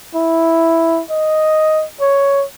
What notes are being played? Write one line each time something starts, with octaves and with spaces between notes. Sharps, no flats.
E4
D#5
C#5